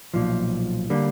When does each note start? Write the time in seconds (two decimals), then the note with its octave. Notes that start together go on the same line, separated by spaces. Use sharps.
0.14 B1 A#2 F3
0.90 D3 G3 A#3